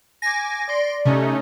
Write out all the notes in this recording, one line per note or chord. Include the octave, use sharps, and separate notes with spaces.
G#5 D6 A#6
D5 C6 D7
C3 A3 C#4 D#4